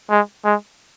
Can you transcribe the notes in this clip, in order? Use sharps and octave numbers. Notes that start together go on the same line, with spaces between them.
G#3
G#3